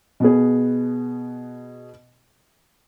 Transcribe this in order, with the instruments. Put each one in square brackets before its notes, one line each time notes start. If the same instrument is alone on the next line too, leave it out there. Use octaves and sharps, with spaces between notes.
[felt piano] B2 B3 G#4